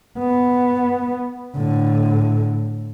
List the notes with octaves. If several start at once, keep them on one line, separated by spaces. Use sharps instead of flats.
B3
A2 D3